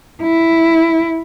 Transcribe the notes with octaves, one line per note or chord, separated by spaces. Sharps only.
E4